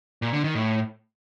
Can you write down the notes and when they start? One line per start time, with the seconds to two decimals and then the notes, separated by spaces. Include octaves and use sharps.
0.22 A#2
0.33 D3
0.44 D#3
0.55 A2